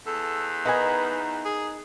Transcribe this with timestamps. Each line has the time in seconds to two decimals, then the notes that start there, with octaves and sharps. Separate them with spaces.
0.06 E2 A4
0.65 B3 D#4 A#4 G#5
1.45 G#4